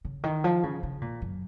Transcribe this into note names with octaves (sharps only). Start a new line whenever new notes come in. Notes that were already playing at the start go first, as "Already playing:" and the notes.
C#3
D#3
F3
C#3
C#3
A#2
F#2